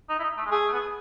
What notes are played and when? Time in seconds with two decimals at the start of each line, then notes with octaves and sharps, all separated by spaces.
0.09 D#4
0.19 E4
0.23 D#4
0.37 A3
0.46 G#3
0.51 A3 G#4
0.68 A3
0.72 B3 G#4